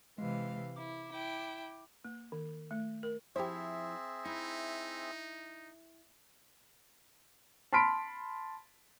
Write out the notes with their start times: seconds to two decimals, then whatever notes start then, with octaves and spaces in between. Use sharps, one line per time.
0.18 C3 E3 G#3 F5
0.76 E4 D6
1.12 E4 G5
2.05 A#3
2.32 D#3
2.71 A3
3.03 A#4
3.36 F3 C4 E4 G4 G#4 C5 E5
4.25 D#4 E4
7.73 A5 B5 C6 F6 B6 D7